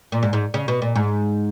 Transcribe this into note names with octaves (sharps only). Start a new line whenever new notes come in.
A#2
G#2
G#2
C#3
B2
A#2
G#2